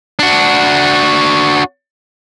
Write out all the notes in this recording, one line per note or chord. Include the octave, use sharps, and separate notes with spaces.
D4 F#4